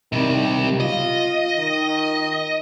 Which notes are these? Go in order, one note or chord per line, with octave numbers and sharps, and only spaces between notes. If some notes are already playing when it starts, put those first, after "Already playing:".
C3 D#3 G3
F4 D#5
D#3